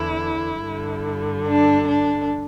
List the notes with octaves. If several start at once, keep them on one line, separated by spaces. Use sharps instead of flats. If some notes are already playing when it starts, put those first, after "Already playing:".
Already playing: E2 D3 E4
G2 D3
D4
D4